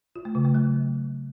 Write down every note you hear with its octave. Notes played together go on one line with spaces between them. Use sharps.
F4
A3
C#3
A3
F#3